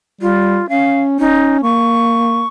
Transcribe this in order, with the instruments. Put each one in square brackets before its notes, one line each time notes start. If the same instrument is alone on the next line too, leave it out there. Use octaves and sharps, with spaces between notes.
[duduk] G3 [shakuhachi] F4
[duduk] C#4 [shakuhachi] F5
[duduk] C#4 [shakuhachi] D#4
[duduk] A#3 [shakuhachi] C#6